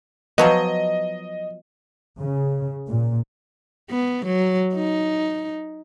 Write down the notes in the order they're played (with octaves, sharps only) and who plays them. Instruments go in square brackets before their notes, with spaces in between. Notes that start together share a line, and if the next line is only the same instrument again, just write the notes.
[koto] F3 F#3 B3 [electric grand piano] D#5
[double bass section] C#3
A#2
[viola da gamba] B3
F#3
D#4